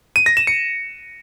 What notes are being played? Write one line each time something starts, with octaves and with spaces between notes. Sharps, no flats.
D#7
A#6
E7
C#7